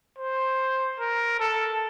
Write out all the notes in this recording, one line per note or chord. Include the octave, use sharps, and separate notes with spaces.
C5
A#4
A4